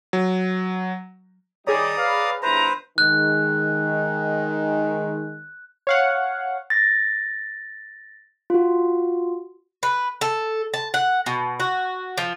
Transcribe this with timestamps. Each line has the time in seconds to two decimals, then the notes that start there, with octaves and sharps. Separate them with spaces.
0.13 F#3
1.67 D#3 G3 D#4 G#4 C#5 D5 A#5 D#6
1.98 B4 F5
2.43 G1 E4 B4 C5 A#5
2.98 D#3 G#3 F#6
5.87 C#5 F5 F#5
6.70 A6 A#6
8.50 F4 F#4
9.83 B4
10.21 A4
10.74 A5
10.94 F#5
11.26 B2
11.60 F#4
12.18 F3